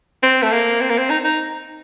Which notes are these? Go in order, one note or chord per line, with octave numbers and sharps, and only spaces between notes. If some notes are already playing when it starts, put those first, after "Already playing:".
C4
A3
A#3
C4
A#3
C4
D#4
D#4